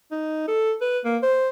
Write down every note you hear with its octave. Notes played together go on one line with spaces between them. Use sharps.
D#4
A4
B4
A#3
C5